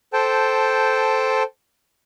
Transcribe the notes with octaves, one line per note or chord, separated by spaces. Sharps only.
A4 C5 G5 A5